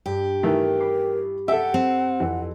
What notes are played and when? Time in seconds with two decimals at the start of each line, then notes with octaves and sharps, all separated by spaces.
0.06 G2 G4
0.43 D#3 E3 A3 A#4
0.80 B5 D6 C7
1.48 G4 A4 E5 F#5
1.74 C4
2.20 F2 E3